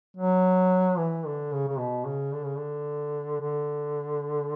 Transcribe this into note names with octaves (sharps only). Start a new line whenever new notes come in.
F#3
E3
D3
C#3
C#3
B2
C#3
D3
C#3
D3
D3